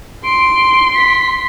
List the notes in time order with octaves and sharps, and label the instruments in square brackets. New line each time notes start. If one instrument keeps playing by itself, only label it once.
[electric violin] C6 [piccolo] D7
[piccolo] B6